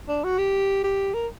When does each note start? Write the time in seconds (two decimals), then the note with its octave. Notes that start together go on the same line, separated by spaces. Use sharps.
0.08 D4
0.24 F#4
0.38 G4
0.84 G4
1.14 A#4